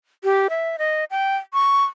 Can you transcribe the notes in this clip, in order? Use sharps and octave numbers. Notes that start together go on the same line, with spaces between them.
G4
E5
D#5
G5
C#6